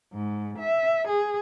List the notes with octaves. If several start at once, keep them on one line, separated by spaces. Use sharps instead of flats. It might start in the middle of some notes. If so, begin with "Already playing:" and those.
G#2
E5
G#4